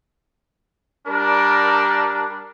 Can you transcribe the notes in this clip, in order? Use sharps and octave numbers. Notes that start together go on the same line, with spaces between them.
G3 D4 A#4